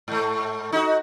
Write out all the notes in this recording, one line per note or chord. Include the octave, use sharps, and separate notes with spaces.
G#2 A3
D#4 F#4